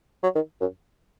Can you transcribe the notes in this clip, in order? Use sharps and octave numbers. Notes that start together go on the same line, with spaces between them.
F#3
D#3
F#2